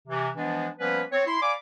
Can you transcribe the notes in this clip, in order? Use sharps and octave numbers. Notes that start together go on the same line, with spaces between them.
C3 E3
E3 F3 G#3 B3 D4
F3 G3 A#3 B3 C#4 B4
C4 C#5
E4 C6
D5 F5 G#5 B5 D6